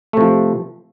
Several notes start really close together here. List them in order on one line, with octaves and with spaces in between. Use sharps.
A3 C3 F3